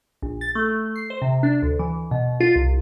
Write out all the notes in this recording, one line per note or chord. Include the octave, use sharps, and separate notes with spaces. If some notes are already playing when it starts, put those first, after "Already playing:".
A#1
A6
A3
C7
C5
C3
D4
D2
E3
B2
F4
C2